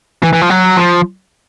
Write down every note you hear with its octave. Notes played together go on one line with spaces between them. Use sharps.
E3
E3
F3
F#3
F3